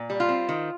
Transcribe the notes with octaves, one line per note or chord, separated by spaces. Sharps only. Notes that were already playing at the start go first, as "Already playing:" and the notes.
Already playing: A#2
G3
F4
C4
D#3